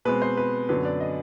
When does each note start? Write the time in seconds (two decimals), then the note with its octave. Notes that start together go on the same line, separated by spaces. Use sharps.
0.05 B2 G#3 C4 B4
0.22 C5
0.37 B4
0.69 F#2 D3 F#3 B3 D4 B4
0.85 D5
1.00 D#5